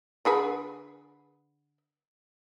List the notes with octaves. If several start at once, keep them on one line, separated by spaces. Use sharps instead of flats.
D3 G#4 B4